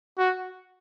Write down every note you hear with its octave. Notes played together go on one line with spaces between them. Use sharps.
F#4